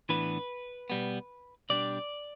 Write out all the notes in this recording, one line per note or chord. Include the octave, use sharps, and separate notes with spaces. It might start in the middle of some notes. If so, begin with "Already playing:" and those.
A2 E3 B3 D4 B4
B2 G3 B3
B2 G3 D4 D5